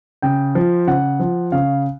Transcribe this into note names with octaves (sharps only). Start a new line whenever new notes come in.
C#3 G5
F3
C#3 F#5
F3
C#3 F5